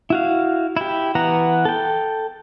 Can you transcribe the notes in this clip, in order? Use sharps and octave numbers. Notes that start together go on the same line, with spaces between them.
E4 F#4 F5
E4 G4
E3 B3 F#5 A#5
A4 G5